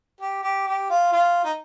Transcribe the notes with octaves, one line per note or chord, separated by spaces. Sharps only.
G4
G4
G4
F4
F4
D#4